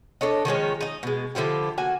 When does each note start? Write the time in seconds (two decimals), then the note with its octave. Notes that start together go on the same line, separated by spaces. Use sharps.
0.21 D4 A4 C#5 D#5
0.45 D#3 F3 G#3 C#4
0.81 D#4 D#5
1.03 B2 G#3
1.35 D3 F3 E4 G4
1.78 A#3 F#4 G#5